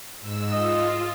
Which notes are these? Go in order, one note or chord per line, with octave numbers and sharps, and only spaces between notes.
G#2 E6
F4 D#5